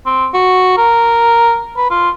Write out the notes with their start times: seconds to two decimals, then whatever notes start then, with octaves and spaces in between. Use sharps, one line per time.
0.06 C4
0.34 F#4
0.77 A#4
1.77 B4
1.90 F4